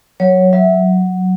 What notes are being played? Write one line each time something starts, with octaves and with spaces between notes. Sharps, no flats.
F#3 C#5
F#3 E5